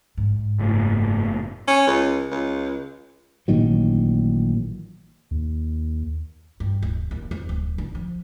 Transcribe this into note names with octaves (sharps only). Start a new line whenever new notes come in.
G#2
F#1 A2
C#4
C#2
C#2
A1 A#2 D#3 F#3
D#2
G2
D1
D#2
F2
D1
D3
F3